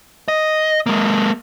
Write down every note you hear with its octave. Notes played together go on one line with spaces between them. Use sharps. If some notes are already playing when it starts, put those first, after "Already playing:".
D#5
G#3 A#3